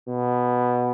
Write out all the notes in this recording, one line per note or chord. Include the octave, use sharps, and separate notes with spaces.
B2